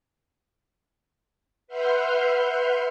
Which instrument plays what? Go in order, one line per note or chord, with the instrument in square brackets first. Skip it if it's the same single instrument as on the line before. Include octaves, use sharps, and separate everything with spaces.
[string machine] B4 E5 F#5 C6 F6 G6